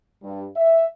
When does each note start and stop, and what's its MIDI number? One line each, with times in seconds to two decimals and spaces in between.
0.23 0.47 43
0.56 0.88 76